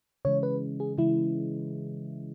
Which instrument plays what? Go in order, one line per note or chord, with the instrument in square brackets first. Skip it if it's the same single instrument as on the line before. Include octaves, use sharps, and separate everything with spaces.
[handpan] C#3 E3 G#3 [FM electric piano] C#5
[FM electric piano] B4
G#4
[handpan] C#3 E3 G#3 [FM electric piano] E4